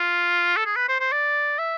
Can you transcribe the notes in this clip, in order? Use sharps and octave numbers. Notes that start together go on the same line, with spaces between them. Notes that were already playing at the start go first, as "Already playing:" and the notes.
Already playing: F4
A4
G#4
B4
C5
C5
D5
E5